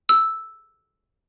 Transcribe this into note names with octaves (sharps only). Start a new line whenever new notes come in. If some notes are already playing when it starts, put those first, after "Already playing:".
E6